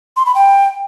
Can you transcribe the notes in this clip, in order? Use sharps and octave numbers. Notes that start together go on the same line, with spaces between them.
C6
B5
G5